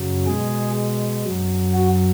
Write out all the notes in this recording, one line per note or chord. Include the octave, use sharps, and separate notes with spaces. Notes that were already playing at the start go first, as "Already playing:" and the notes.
Already playing: F#2 C#3 F#3
B2 G#3 G#4
F#2 F#3
F#4